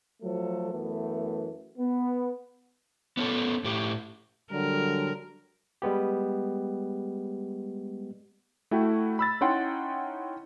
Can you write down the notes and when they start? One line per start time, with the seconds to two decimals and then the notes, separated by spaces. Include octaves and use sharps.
0.22 F3 F#3 A3 A4
0.72 F#2 E3 A3 B3
1.78 B3
3.17 B3 C#4 A4
3.64 A2 G4
4.52 D3 F#3 G3 A#4
5.82 G3 G#3 B3 G4
8.71 A3 E4 F#4 G5
9.19 B5 E6 A6
9.41 C#4 D#4 E4 F#5 G5 C6